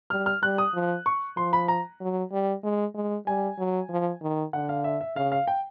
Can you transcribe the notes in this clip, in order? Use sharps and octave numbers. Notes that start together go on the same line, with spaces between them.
G3 F6
F6
G3 F#6
D#6
F3
C#6
F3 C6
B5
A#5
F#3
G3
G#3
G#3
G3 G#5
F#3
F3
D#3
D3 F#5
F5
E5
E5
C#3 F5
F5
G5